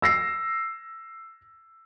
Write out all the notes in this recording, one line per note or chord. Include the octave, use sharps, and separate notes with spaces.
E6 A#6 C7